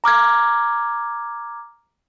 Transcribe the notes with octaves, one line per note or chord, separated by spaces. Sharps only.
A#5 D6 F6 G#6